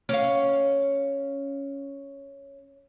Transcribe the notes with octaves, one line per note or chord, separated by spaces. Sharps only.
C#4 F5